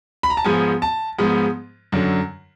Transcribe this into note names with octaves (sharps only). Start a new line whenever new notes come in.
B5
A#5
A5
G#2 F3 G#3 B3 G#5
A5
G#2 F3 G#3 B3
F#2 D3 F#3